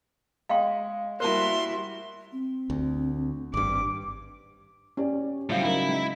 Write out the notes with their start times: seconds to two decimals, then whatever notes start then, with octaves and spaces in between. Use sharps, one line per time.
0.49 G#3 F5 G5 C6
1.20 G3 A#3 E4 F#4 C5 A5 C6
2.33 C4
2.70 D2
3.54 G#1 G2 D6
4.97 C#4 G4 D5
5.50 A2 C#3 F#3 G3 C4 F5
5.63 D#4 E4 A#4
5.89 G#3